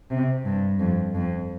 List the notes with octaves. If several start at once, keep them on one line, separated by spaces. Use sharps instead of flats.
C3
G2
F2
F2